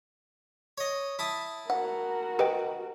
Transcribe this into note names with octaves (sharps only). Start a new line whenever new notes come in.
C#5 D#5
E4 A5 D#6
F#4 A#4 F#5
G4 B4 D#5 G5